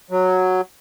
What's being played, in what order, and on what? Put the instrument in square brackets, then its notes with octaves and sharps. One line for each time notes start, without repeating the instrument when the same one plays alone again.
[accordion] F#3